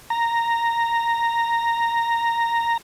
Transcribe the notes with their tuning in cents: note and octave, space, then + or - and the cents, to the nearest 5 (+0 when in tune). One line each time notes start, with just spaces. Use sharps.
A#5 -5